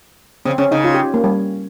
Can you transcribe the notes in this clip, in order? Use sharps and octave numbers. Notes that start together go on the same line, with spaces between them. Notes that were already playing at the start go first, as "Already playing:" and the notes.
C#3 C4
C#3 C#4
C#3 D#4
F4
G4
A#3
G3